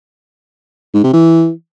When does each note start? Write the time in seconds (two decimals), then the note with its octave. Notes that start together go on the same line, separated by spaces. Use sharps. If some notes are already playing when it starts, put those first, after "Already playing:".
0.94 G#2
1.04 C3
1.13 E3